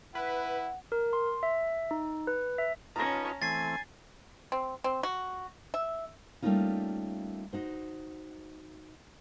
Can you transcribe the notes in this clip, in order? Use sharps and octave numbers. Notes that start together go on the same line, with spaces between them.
E4 B4 F#5
A#4
C6
E5
D#4
B4
E5
C#4 D#4 F4 B4 A5 A#5 A#6
E3 A3 C4 G#5 A6 C7
C4
C4
F#4
E5
G3 A3 A#3 C#4 D#4 F4
D#4 F#4 C5